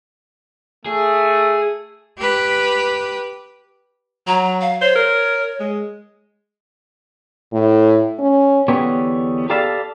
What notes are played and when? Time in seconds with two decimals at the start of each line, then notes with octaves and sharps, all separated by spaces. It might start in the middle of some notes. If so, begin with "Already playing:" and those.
0.86 A3 G#4
2.18 G4 B4
4.27 F#3 A#5
4.61 F5
4.81 C5 C#5
4.95 A#4
5.60 G#3
7.53 A2
8.19 C#4
8.68 E2 D3 B3 G4 C#5
9.50 G4 A4 D5 F5 A5 B5